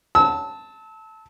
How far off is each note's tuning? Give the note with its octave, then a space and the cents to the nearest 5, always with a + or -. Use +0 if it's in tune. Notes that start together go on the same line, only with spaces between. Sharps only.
A5 +0 E6 -30